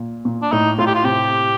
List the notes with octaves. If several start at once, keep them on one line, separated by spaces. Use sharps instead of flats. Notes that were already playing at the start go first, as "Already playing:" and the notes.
Already playing: A#2
A#2
D4
A2 D#4
A2 F4
G4
F4
C3 G4